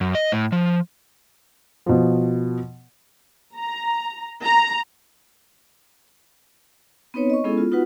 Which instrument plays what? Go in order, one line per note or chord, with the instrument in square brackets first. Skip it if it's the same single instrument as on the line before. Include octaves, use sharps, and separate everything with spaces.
[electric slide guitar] F#2
D#5
A2
F3
[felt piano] B2 F3
[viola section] A#5
A#5
[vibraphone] B3 C4 D#4 B4 C#5
D#5 C#6
G#3 B3 C#4 E4 G#4 A4
F4
B3 D#4 F4 F#4 B4 F#5